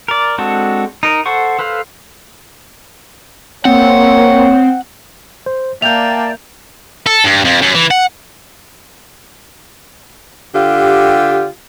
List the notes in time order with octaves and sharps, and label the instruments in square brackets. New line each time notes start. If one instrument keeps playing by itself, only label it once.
[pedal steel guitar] A#4 D5
G#3 C4 D4 F#4 A4
D#4 A#4
A4 C5 F#5 C#6
A4 B4 C5 F5
[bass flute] A#3 [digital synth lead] C4 [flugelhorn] C#5 [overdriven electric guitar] F#5
[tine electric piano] C5
[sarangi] A#3 [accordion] D5 G5 A5 [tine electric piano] E5 G6 [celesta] F7
[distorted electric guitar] A4
G2
F2
F#2
E3
F#5
[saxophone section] D3 F4 G4